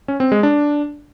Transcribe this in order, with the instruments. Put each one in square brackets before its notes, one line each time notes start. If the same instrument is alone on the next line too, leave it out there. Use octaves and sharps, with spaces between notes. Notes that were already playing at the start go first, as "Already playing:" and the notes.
[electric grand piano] C#4
C4
G#3
D4